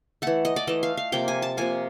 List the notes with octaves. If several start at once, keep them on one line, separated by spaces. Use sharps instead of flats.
E3 A3 F#5
D#5
D5
E3 A3 D#5
F5
F5
C3 F3 A#3 G5
G#5
A5
C3 F3 A#3 G#5